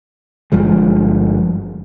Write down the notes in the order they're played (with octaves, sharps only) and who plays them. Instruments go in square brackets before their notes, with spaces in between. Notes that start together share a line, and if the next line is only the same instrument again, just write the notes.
[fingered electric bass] G1 G2 F3 G#3